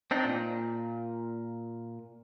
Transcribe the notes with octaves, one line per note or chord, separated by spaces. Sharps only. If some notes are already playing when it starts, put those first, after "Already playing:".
C4 D4 D#4
A#2